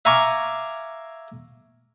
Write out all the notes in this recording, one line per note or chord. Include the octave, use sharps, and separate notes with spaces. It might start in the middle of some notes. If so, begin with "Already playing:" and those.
E5 F5 G#5 A#5 C#6 D6